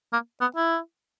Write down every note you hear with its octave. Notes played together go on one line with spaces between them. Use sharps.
A#3
B3
E4